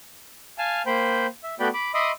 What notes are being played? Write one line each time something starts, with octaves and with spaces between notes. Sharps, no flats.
F5 G#5 A5 F6
A#3 C5 G5 B5
E5
A3 B3 F#4 D5 G5 B5
B5 D6
D#5 E5 B5 C6 D6 D#6